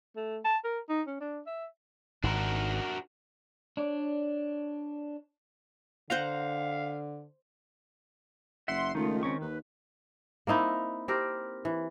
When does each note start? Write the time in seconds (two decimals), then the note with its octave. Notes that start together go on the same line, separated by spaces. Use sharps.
0.16 A3
0.44 A5
0.64 A#4
0.89 D#4
1.07 C#4
1.20 D4
1.46 E5
2.24 G#1 G#2 D4 F#4 A#4
3.77 D4 C#5 D5
6.10 D3 C5 F5 F#5 A#5
8.68 F#1 E5 F#5 C6
8.95 C#2 D#3 A3 F4
9.23 C4 C#4 C#6
9.42 D#2 B4
10.47 A#3 C4 D#4 E4
11.08 C4 G4 A#4
11.65 E3